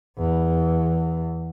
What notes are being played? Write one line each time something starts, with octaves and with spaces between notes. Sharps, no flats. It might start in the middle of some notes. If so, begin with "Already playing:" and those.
E2